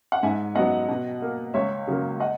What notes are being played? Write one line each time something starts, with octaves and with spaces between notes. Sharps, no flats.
F#5
G#2 E5 G#5
F#3 B3 D#5 F#5
B2
A#3
C#2 C#5 E5
C#3 F#3 A#3
D#5 F#5